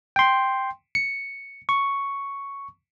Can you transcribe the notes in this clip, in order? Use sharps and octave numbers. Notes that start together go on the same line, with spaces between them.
G5 C6
C#7
C#6